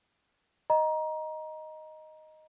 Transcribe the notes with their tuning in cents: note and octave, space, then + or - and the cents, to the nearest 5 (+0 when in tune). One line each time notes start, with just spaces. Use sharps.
D#5 +0 A#5 +20